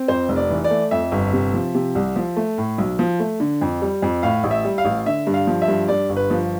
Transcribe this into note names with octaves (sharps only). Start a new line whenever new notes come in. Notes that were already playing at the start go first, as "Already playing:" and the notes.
Already playing: C4
F2 C5
F1
D5
E3
D5
A3
F2 E5
G1
C3
F3
C3
C2
F3
A3
A2
B1
F3
A3
D3
F2
G3
F2
A2 F5
A1
E5
G3
F5
A1
D3 E5
G2
F5
F3
E5
G2
G2 D5
G1
B4
F3